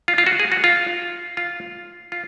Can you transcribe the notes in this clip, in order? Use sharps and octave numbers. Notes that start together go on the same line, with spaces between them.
F4
F4
F#4
G#4
F#4
F4
F4
F4